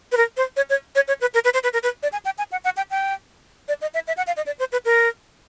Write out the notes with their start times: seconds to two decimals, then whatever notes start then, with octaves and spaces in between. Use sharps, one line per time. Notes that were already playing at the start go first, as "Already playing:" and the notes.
0.12 B4
0.17 A#4
0.37 C5
0.56 C#5
0.70 C#5
0.95 C#5
1.08 C#5
1.21 B4
1.34 A#4
1.44 B4
1.54 C5
1.63 B4
1.73 A#4
1.83 B4
2.03 D5
2.12 G#5
2.25 G5
2.38 G#5
2.52 F#5
2.64 F#5
2.77 G5
2.90 G5
3.68 D5
3.81 D#5
3.94 E5
4.07 E5
4.17 F#5
4.27 F5
4.37 D#5
4.46 D5
4.59 C5
4.72 B4
4.85 A#4